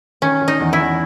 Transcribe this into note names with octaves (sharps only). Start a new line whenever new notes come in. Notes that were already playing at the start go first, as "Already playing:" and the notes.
D#3 C#4
D#3
D#4
E2
E4
E2